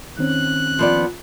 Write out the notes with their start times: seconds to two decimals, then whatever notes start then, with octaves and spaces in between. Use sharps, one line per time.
0.19 D#3 C4 C#4 F#6
0.79 F3 B3 D5